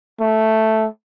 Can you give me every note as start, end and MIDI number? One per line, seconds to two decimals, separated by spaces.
0.20 0.87 57